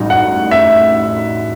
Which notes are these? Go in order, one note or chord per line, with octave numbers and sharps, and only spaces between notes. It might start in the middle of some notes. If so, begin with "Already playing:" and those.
Already playing: A1 A2 G3 D#4 F#4
F#5
E5